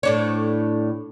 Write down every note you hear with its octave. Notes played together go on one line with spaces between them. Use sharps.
A2 D4 C#5